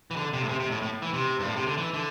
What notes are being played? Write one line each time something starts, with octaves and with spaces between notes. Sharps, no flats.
E3
D3
C3
A2
C3
C3
A2
A2
E3
C3
G2
A2
C3
D3
E3
D3